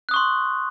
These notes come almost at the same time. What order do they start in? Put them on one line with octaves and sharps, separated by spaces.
F#6 D#6 C#6 C6